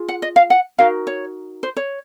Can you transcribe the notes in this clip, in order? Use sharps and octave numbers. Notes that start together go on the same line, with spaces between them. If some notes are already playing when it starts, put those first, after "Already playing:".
Already playing: F4 G#4
F#5
D#5
F5
F#5
D#4 F#4 A#4 F5
C#5
C5
C#5